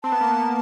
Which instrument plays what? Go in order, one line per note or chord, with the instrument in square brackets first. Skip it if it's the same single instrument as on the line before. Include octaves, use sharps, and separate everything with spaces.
[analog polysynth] C4 [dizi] A5
[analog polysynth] B3
A#3
B3